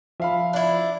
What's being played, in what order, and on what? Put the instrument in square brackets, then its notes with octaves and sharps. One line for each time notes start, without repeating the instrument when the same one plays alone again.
[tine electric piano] F3 [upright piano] E5 F5 B5
[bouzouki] D4 E4